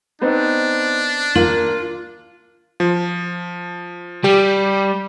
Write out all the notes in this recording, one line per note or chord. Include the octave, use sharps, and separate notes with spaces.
B3 C4 D4 D#4
A#3 F4 F#7
F3
G3 G4